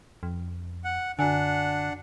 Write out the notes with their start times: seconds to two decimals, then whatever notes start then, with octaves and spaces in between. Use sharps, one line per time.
0.23 F2
0.84 F#5
1.19 F#2 D3 D4 F#5 G#5